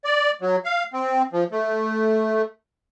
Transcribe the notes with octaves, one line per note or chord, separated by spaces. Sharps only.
D5
F#3
F5
C4
F3
A3